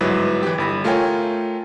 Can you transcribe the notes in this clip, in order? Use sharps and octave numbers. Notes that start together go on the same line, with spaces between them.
G1 G#2 F#3 E4 B4
E3 G4
G1 B5 A#6
A3 F4 A#4 C#5 G5 G#5